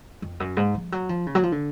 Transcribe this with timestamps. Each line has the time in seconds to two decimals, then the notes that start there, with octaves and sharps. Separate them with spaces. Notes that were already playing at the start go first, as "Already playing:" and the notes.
0.22 F2
0.40 F#2
0.57 G#2
0.74 F3
0.92 F#3
1.09 F3
1.26 C#3
1.35 F#3
1.43 F3
1.52 D3